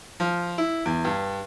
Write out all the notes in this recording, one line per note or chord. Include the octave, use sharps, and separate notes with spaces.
F3
E4
E2
G2